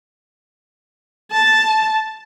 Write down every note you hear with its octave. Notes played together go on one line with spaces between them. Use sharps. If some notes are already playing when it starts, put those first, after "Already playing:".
A5